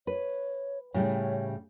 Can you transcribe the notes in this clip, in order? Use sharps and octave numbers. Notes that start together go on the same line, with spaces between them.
B4 C#5
A2 C#3 G3 C#5